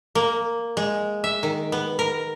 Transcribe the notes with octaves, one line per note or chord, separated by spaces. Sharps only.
A#3
G#3
E5
D#3
B3
A#4